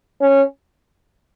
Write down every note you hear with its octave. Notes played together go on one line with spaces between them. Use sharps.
C#4